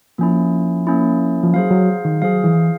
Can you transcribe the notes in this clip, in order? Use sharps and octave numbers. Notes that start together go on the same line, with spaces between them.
F3 A#3 C#4 E4
A#3 C#4 E4
F3
F#3 G#4 C5 F5
F#3
D#3
F#3 G#4 C5 F5
E3